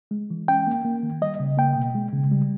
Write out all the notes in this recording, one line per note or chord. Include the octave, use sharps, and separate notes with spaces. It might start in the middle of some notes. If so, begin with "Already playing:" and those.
G#3
E3
C#4 G5
A#3
A#3
D#3
G3 D#5
C#3
A#3 G5
B2
G#3
C#3
G3